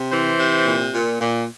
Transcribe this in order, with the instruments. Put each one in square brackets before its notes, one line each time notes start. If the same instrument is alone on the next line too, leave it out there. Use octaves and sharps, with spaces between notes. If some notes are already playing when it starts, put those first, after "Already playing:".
Already playing: [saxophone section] C3
E3 C5
C3
A#2
A#2
A#2